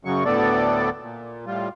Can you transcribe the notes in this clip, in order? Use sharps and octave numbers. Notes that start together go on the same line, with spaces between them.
F#2 C#3 F#3 C#6
D2 A2 B3 A4 D5
A#2
A2 G3 F4